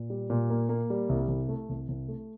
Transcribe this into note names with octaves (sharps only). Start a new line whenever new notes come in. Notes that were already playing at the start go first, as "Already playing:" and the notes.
Already playing: A#2
G3
A#2
A#3
A#3
G3
C2
C2
A3
C2
C2
A3